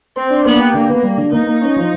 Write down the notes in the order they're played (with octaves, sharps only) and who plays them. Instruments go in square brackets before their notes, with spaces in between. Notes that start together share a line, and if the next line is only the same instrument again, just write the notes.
[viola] C4 [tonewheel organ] C5
[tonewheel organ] D4
[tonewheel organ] A#3 [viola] B3
[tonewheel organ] G4
[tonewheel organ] D3 [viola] A#3
[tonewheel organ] B3
G3
D3
[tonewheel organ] A#3 [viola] D#4
[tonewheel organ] A#3
C#4
F3